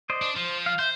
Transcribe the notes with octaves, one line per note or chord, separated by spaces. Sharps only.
C5 D5 D#5
D4
F3 C5
F5
C5 E5 G6